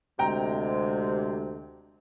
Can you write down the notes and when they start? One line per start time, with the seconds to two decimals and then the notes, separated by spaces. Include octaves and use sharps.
0.19 D2 C3 G#3 G5 A#5